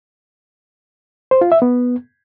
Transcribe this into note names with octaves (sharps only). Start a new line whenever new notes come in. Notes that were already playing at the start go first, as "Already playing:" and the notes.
C5
F4
E5
B3